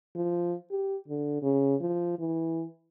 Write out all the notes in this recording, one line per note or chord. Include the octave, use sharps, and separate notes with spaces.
F3
G4
D3
C#3
F3
E3